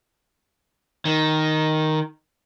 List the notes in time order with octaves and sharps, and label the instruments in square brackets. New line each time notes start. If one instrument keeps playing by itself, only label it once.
[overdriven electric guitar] D#3